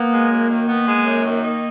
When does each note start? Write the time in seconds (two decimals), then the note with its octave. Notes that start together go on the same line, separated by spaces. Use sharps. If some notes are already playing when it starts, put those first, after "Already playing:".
Already playing: A#3 B3
0.12 G#3
0.31 F#2
0.49 D#3
0.69 B3
0.88 G#3
1.06 F#2
1.25 D#3
1.44 D#4